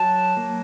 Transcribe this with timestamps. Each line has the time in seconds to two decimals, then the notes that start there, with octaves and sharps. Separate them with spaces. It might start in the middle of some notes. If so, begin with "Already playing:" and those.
Already playing: F#3 A5
0.37 A#3